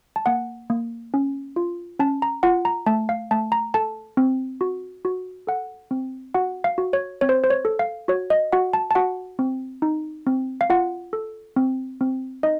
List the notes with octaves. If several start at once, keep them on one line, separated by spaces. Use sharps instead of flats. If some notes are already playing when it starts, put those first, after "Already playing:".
A5
A#3 F#5
A#3
C#4
F4
C#4 A5
A#5
F4 F#5
A#5
A3 A5
F5
A3 A5
A#5
A4 A5
C4
F#4
F#4
A4 F#5
C4
F#4 F#5
F5
F#4
C#5
C4 C#5
C5
C5
C#5
A4
F5
F#4 C#5
D#5
F#4 F#5
A5
A5
F#4 F#5
C4
D#4
C4
F5
F4 F#5
A4
C4
C4
D#4 D#5